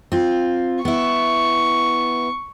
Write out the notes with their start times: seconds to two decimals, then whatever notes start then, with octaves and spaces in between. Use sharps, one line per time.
0.12 C4 F4
0.85 B3 E4 C#6